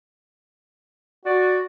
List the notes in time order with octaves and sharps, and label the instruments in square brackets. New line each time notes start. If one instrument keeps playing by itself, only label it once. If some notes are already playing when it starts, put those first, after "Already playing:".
[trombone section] F#4 [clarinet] D5